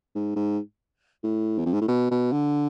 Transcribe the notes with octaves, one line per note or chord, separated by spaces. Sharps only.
G#2
G#2
A2
E2
F2
G#2
A2
B2
B2
D3